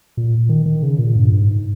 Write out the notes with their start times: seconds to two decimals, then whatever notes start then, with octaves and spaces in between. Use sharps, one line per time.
0.17 A#2
0.49 D#3
0.66 D#3
0.83 C#3
0.99 A#2
1.15 G2
1.31 G2
1.39 G#2